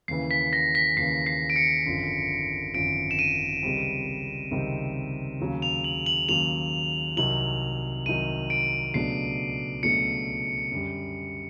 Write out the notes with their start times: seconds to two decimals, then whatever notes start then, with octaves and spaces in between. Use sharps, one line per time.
0.08 D#2 C#3 E3 C7
0.31 B6
0.53 A#6
0.75 B6
0.97 D#2 C#3 E3 C7
1.26 C7
1.50 D7
1.56 C#7
1.86 G#1 F#2 D3 F3
2.74 G#1 F#2 D3 F3 D7
3.11 E7
3.19 D#7
3.63 C#2 C3 D#3 G3 C4
4.51 C#2 C3 D#3 G3 C4
5.40 D#2 C#3 F#3
5.62 F7
5.84 F#7
6.06 F#7
6.29 D#2 C#3 F#3 F7
7.17 C2 C3 D#3 F#3 F#7
8.06 C2 C3 D#3 F#3 D#7
8.50 D7
8.94 C#2 B2 F#3 A3 D4 C7
9.83 C#2 B2 F#3 A3 D4 C#7
10.71 F#2 D3 G3